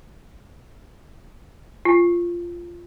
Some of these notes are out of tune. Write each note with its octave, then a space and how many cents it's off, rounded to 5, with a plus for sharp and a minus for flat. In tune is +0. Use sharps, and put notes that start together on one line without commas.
F4 -10